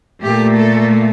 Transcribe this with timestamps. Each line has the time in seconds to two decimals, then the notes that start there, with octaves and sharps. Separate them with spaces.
0.22 A#2 A3 G4
0.57 A4